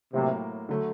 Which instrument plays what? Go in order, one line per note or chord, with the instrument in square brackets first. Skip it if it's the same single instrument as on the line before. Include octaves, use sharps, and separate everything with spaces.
[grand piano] A2 F#3 A#3 [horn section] C3
[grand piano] D3 F#3 A3